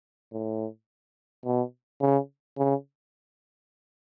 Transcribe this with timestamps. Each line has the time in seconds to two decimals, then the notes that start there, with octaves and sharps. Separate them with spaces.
0.32 A2
1.45 B2
2.01 C#3
2.57 C#3